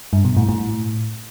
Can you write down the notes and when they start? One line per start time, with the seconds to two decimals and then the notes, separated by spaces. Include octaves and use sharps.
0.13 G2
0.25 B2
0.37 A2
0.49 A2